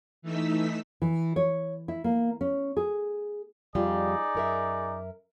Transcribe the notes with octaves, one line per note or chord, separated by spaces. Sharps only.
E3 A3 D#4 E6 B6
E3
C#5
E4
A#3
C#4
G#4
F2 G3 D#4 F4 G#4 D5
F#2 A#4 E5